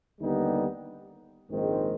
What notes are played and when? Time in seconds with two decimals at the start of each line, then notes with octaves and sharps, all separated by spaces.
0.20 D#2 D3 G3 B3 D#4
1.49 A#1 G#2 D#3 G#3 C4